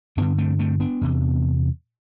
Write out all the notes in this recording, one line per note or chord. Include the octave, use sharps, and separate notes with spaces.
G2 D3 B3 D4
A3 C4
A3 C4
B3 D4
E2 C3